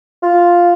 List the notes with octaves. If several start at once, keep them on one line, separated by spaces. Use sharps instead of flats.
F4